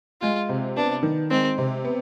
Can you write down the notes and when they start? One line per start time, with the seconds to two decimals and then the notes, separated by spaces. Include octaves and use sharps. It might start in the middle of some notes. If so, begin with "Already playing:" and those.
0.21 G#3 F4
0.49 C3
0.76 B3 D4
1.03 D#3
1.30 G#3 C4
1.58 C3
1.85 B3